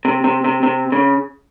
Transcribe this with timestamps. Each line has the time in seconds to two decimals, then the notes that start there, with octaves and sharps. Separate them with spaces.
0.05 C3
0.24 C3
0.44 C3
0.63 C3
0.92 C#3